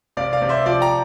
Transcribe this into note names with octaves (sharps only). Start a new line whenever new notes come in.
C3 D5 F5
D5 F5
C3
C5 E5
F3 D5 F5
G5 A#5